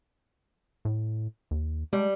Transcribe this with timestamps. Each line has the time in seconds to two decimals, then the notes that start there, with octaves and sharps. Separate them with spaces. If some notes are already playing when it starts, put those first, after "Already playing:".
0.85 A2
1.51 D#2
1.93 G3 G#3